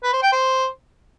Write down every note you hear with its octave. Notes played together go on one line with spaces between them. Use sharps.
B4
C5
G5
C5